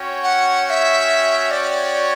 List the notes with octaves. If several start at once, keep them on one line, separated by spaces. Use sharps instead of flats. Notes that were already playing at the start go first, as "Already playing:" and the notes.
Already playing: C#4 F#4 C#5 G5
F#5
F#5
E5
D5